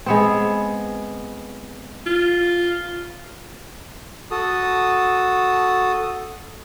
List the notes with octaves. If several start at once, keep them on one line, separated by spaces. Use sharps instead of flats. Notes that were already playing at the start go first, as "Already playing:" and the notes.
G#3 B3 C4
F4
F#4 A4 A5 D#6